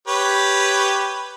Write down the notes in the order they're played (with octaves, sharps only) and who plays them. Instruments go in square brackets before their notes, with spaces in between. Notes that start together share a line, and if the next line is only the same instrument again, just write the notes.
[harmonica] G4 B4 C#5